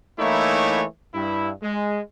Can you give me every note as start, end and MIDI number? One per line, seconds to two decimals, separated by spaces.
0.19 0.83 52
0.19 0.83 57
0.19 0.83 58
0.19 0.83 63
0.19 0.83 64
0.19 0.83 73
1.14 1.50 43
1.14 1.50 64
1.63 2.00 56